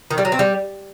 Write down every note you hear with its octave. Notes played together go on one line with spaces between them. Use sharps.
D#3
G3
F#3
C4
G3